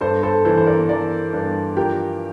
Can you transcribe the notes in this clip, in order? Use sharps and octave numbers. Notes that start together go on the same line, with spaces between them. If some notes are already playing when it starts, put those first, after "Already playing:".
G2 A4 C5
A4 C5
E3 A4 C5
C5
A#4 D5
E3 A#4 D5
G2
F3 G4 A#4